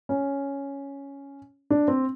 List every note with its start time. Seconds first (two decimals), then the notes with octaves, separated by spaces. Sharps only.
0.09 C#4
1.70 D4
1.88 C4